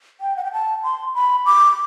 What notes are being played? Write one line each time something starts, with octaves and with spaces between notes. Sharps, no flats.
G5
F#5
G5
A5
C6
B5
D6